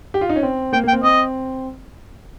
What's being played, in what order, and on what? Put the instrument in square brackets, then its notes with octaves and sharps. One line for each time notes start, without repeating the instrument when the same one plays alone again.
[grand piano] G4
F4
D#4
C#4
C4
[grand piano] A#3 [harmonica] G5
[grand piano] A#3 [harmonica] G5
[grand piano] C4
[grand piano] C4 [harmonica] D#5